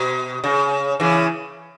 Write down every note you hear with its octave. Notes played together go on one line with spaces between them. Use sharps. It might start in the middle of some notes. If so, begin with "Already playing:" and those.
Already playing: B2
C#3
C#3 E3